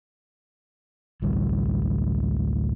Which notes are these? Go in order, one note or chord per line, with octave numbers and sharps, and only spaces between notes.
A1 D2 G3